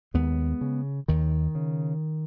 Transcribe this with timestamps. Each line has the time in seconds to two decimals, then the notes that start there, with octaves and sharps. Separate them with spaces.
0.14 D#2 G#3 B3
0.61 C#3
1.08 D#2 D#3
1.55 C#3